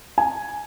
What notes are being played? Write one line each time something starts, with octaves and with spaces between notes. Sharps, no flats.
G#5